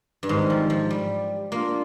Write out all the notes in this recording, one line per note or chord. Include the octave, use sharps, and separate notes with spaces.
G2
G#2 D#3 G3 C4 D#4 A#4
F3
F3
G3
A#3 D4 F4